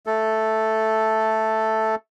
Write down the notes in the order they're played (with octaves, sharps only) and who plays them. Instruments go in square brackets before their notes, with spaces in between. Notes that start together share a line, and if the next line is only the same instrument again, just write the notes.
[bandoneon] A3 A4